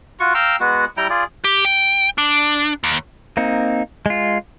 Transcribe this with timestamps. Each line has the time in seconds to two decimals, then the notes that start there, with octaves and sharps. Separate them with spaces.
0.20 F4 F#4 C#6
0.34 F5 G5 A#5 E6
0.60 G#3 B3 F#4
0.97 G3 E4 G5 A#5
1.10 F4 G#4 D5
1.44 G4
1.65 G5
2.18 D4
2.84 D#2
3.37 A#3 C4 D#4
4.06 G#3 F4